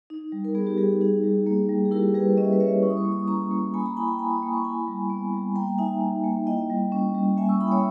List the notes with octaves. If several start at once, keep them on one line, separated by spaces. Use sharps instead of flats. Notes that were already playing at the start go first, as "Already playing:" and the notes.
D#4
G3
A#4
B3 G#4
G4
G3 G#4
G#4
D#4 G#4
G3
A#3
G3
G#4
E4 G4 A#4
G3 G#4 B4
C#4 D#5
E5
B4 D#5
G3 C#5 E5
E4 C#6
D#6
C#6
A#3 D#6
C#6
D#6
C#4 A#5 C#6
A#3
A#3 G#5 B5
D#6
A#5 C#6
E4 G#5 B5
G5 A#5
E4 G#5 B5
B5 D#6
A#3
A#5 C#6
E4 G#5 B5
G3
B3
G3
A#3 G5 A#5
D#4 E5 G#5
D#4
A#3
E4 D#5 G5
G3
C#4
G3
A#3 E5 G#5
C#6 E6
E4 B5 D#6
G5
C#5 E5